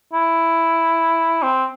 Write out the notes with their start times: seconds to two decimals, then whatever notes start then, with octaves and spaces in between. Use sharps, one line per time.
0.13 E4
1.42 C4